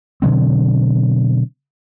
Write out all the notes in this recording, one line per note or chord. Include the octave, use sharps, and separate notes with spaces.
B2 D3 F#3 C4